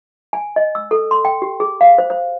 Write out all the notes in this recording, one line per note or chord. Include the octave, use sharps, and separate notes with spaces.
G#5
D#5
E6
A4
C6
G5
G4
G#4
F5
C5
C5